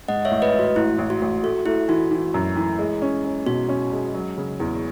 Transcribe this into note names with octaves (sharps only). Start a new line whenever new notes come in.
G#2 D#5 F#5
C#5 E5
A1
B4 D#5
A1
F#4
A1 E4
A1
F#4
A1
A3 F#4
A3 E4
E3 F#4
E3
F#2
E3
G#3
C#4
C#4
B2 F#4
C#4
G#3
F#3
C#3
E2